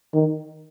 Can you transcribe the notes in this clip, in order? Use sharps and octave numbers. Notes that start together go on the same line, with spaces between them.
D#3